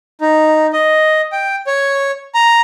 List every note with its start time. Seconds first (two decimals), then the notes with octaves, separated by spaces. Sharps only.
0.21 D#4
0.73 D#5
1.32 G5
1.67 C#5
2.35 A#5